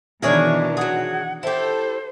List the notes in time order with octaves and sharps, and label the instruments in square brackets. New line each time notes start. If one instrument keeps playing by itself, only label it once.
[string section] B2 D#3 E3 [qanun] D4 A#4 [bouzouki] E4 G#4 C#5
[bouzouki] F#3 G#4 [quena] F#5
[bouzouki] E4 G4 [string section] A4 [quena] C5